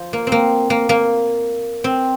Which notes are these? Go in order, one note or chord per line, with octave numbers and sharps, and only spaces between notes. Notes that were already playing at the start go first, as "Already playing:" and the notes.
Already playing: F3
A#3
C4
A#3
A#3
A#3
C4